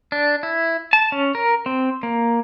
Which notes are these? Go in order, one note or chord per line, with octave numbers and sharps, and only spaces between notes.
D4
E4
A5
C#4
A#4
C4
A#3